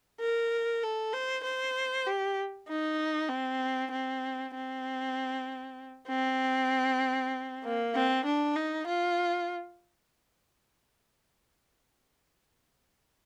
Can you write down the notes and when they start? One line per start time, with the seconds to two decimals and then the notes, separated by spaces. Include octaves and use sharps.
0.20 A#4
0.83 A4
1.13 C5
1.44 C5
2.07 G4
2.68 D#4
3.29 C4
3.92 C4
4.54 C4
6.08 C4
7.64 A#3
7.95 C4
8.25 D4
8.56 D#4
8.87 F4